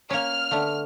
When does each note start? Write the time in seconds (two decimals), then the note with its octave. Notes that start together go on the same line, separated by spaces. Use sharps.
0.10 A#3 C#4 F6
0.51 D3 A3 B3